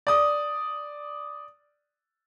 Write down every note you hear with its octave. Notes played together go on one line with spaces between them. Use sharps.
D5 D#6